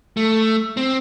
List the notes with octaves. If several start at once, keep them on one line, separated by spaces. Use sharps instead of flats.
A3
C4